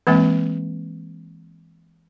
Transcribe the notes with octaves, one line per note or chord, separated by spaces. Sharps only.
E3 G#3 A#3 C4